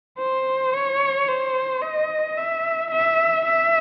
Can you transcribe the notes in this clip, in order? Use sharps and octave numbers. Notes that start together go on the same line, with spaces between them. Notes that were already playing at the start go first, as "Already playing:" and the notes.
C5
C#5
C5
D#5
E5
E5
E5